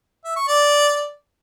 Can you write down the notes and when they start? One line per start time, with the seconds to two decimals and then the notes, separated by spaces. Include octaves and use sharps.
0.24 E5
0.36 C#6
0.48 D5